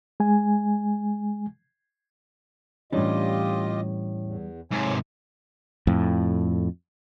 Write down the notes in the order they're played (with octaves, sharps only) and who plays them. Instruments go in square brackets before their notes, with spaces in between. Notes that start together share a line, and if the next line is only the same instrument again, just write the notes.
[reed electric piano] G#3 G#5
[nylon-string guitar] A2 C#4 [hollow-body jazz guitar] E3 G3 D4 [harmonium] F4 G4 D#5
[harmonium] E2
[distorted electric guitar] G#2 C3 [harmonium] C#5 G#5
[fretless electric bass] F2 A2